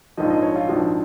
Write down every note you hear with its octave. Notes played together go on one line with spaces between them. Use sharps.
A#1 G#2 F3 D#5
D#5
C#5
F4
A#1 G#2 F3 F#4